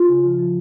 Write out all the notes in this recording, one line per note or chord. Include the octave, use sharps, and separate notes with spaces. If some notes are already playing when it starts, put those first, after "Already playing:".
Already playing: F4
C#3
F3
F3